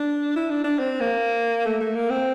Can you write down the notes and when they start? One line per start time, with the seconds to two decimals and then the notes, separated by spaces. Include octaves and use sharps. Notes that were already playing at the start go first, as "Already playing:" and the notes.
Already playing: D4
0.36 E4
0.50 D4
0.64 D4
0.79 C4
1.00 A#3
1.66 A3
1.81 A3
1.95 A#3
2.10 C4